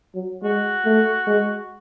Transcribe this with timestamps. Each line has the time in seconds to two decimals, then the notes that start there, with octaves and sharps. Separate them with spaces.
0.15 F#3
0.42 G#3 F#4
0.85 A3
1.26 G#3